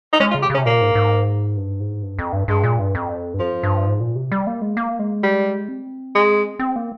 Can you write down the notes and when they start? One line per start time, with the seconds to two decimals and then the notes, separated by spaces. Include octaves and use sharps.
0.13 D#4
0.20 G#3 C#4
0.31 F4
0.35 C#3
0.42 G4
0.50 C#3 C#4
0.58 C3
0.65 A#2 A#3
0.81 G#2
0.95 G#2
1.57 G2
1.80 G#2
2.03 G2
2.19 F2
2.33 G2
2.48 G2 G#3
2.64 A#2
2.79 G2
2.95 F2
3.34 G2
3.39 F2 F3
3.63 G2
3.86 G#2
4.01 A#2
4.16 C3
4.32 G3
4.47 A#3
4.62 G#3
4.77 A#3
4.99 G#3
5.23 G3
5.68 C4
6.15 G#3
6.59 C4
6.76 A#3